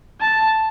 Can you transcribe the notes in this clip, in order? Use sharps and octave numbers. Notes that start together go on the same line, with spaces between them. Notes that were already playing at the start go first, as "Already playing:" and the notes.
A5